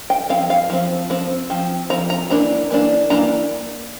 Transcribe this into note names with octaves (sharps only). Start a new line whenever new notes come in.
G5
F3 C4 F5
F5
F3 C4
F3 C4
F3 C4
F3 C4 A#5
A#5
E3 A#3 D4 A#5
E3 A#3 D4
E3 A#3 D4 A#5